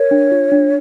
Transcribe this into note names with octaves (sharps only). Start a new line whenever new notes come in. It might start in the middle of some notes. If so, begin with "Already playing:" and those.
Already playing: A#4 C#5
D4
F4
D4